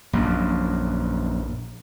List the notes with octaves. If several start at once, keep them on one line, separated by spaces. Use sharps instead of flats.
A#1 F#2